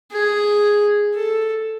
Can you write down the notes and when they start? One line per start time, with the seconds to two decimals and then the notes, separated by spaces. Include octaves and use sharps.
0.12 G#4
1.15 A4